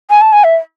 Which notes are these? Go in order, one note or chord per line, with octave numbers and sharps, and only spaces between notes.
G#5
A5
G#5
E5